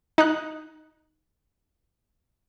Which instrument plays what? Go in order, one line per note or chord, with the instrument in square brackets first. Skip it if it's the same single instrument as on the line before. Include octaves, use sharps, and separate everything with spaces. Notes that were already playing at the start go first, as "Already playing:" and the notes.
[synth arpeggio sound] D#4 F#6